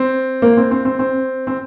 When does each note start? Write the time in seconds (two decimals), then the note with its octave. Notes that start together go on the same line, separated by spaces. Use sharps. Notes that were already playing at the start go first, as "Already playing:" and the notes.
Already playing: C4
0.42 A#3
0.57 C4
0.71 C4
0.85 C4
0.99 C4
1.47 C4